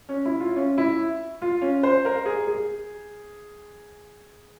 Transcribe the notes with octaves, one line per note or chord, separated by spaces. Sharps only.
C#4
E4
F4
C#4
E4
F4
C#4
C5
A#4
G#4
G#4